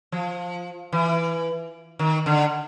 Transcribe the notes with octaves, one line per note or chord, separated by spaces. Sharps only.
F3
E3
D#3
D3